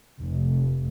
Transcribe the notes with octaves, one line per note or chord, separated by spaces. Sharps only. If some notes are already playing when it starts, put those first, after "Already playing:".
F1